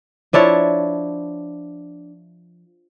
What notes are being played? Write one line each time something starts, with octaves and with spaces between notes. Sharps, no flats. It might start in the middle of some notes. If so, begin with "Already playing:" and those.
F3 D4 E4 C#5